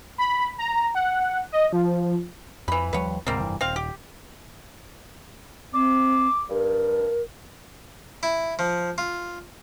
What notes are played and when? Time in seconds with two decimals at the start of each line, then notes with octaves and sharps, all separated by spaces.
0.18 B5
0.58 A#5
0.95 F#5
1.52 D#5
1.73 F3
2.68 F2 E3 B5
2.93 D#2 F3 G3 B4 C#5
3.27 D2 G#2 C3 G3 A#3 C4
3.39 F1 G2 E3
3.61 D#1 C4 F5
3.76 G4
5.73 C4 D6
6.50 G2 A#4
8.23 E4
8.59 F3
8.98 F4